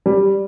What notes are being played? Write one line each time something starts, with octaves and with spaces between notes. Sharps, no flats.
G3